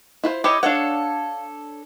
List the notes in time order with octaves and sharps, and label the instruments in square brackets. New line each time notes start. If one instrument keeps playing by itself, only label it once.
[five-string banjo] E4 F4 C5
[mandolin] E4 C#5 D#5 [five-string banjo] G4
[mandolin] D4 A4 C#5 [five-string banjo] F5 F#5